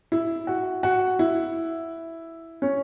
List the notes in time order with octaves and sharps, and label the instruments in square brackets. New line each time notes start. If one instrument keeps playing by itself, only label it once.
[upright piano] E4
F#4
F#4
E4
C#4